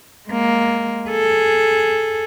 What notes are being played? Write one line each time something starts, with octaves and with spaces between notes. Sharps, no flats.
G#3 A#3
G#4 A4